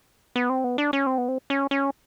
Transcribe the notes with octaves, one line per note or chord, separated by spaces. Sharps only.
B3
C4
B3
D4
C#4
C4
B3
C4
C#4
C#4